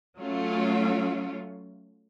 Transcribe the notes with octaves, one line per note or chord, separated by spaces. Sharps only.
F#3 A3 C#4 F4